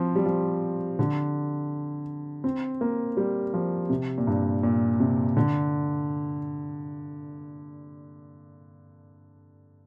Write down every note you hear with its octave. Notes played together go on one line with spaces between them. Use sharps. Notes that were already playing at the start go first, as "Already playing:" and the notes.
Already playing: F3 C4
G3
F3
D3
C4
A#3
G3
F3
C3
A#2
G2
A#2
C3
D3